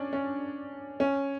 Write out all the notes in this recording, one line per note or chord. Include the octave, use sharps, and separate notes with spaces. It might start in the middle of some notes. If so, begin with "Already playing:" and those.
Already playing: C#4 D4
C#4
C#4